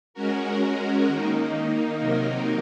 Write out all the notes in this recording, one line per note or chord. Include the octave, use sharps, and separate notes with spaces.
G#3 C#4 F#4 A#4
D#3 A#3 D#4
C3 F#3 A#3 D#4 A#4